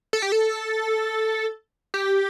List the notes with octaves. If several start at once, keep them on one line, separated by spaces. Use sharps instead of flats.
A4
G4
A4
G4